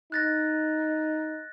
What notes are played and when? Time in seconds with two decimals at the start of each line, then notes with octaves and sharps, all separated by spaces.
0.12 D#4 F#6 A6 A#6